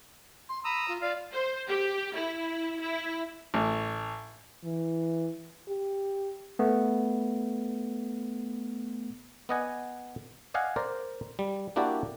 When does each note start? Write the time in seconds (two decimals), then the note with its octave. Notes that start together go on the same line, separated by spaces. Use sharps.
0.49 C6
0.65 A#5 B5 D#6 E6
0.88 F4
1.01 F4 D5 F5
1.32 C5
1.68 G4
2.15 E4
2.80 E4
3.54 A1
4.64 E3
5.68 G4
6.59 A3 B3
9.49 B3 D5 D#5 F#5 G#5
10.54 D5 D#5 F5 F#5 G#5
10.76 A#4 C5 D5
11.39 G3
11.76 A#3 D4 E4 F#4 G4 D5